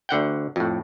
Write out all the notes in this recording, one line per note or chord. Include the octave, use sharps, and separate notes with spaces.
D2 D3 F#5 G5
F2 A2